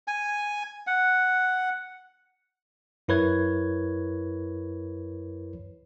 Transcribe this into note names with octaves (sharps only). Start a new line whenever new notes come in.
G#5
F#5
F#2 E4 A#4 B4 C#5 G#6